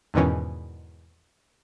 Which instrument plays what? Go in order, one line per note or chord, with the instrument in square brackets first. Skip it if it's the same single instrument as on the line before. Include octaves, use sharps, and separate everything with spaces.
[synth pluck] E2 G#2 B2 D#3 E3 C#4